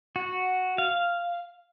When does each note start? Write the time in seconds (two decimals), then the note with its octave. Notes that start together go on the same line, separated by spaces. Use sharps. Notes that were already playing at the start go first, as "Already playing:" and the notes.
0.16 F#4
0.78 F5